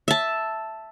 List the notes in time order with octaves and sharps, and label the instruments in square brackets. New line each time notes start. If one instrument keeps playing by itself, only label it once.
[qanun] E5 A5